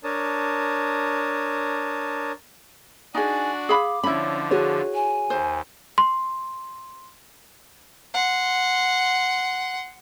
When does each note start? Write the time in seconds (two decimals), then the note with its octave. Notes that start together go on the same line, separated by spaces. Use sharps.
0.04 D4 A#4 C#5 A5 D#6
3.15 D4 D#4 F#4 G#4 D5 G#5
3.69 G#4 F5 B5 D6
4.03 D3 F3 C#4 E4 B5
4.51 F#4 G#4 C#5
4.95 G#5
5.30 D#2 C5
5.98 C6
8.14 F#5 C6